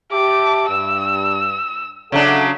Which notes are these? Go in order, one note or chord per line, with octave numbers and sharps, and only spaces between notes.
G4 E5 A5 D6
G2 E6
C#3 F#3 D4 A4 E5 F#5